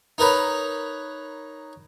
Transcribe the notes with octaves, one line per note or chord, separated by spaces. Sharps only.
D#4 A#4 B4 C#5